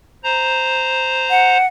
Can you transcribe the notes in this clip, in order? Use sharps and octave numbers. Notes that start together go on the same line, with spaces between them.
C5 A#5
F#5